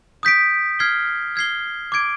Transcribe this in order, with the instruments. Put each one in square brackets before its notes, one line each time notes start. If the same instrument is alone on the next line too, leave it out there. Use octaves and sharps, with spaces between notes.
[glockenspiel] D#6 G6 B6 D7
F6 G#6 C7 G7
F6 G#6 C7 G7
D6 G#6 D7